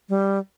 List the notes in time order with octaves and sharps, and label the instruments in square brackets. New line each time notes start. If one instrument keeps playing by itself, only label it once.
[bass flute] G3